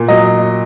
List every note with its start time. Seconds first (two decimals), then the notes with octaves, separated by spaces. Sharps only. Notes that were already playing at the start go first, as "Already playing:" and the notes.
Already playing: A#2
0.08 F#3 D#5